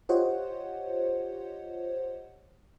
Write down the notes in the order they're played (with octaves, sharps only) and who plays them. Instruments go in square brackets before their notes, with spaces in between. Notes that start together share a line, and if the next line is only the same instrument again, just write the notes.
[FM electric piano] F4 G4 C5 C#5 D#5 F#5